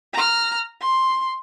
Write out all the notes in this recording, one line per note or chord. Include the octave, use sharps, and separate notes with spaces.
A#5 F6
C6